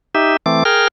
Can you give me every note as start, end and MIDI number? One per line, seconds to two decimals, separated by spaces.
0.15 0.37 63
0.15 0.37 67
0.15 0.37 76
0.46 0.63 52
0.46 0.63 57
0.46 0.63 60
0.46 0.63 86
0.65 0.88 68
0.65 0.88 70
0.65 0.88 79
0.65 0.88 89